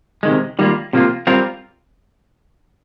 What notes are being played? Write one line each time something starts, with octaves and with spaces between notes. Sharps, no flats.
C3 D#3 G#3
D#3 G3 A#3 F4
C3 F3 A#3 F4
G3 C4 F4 A#4